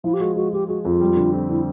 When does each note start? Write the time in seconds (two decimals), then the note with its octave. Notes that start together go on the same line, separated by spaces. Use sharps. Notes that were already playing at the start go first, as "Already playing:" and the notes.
0.04 F3 E4
0.13 G4
0.20 G#3 F#4
0.36 G#3 F#4
0.53 G#3 G4
0.68 G#3 F#4
0.85 F2 F4
1.01 G3
1.16 D3
1.33 C4
1.49 D3 E4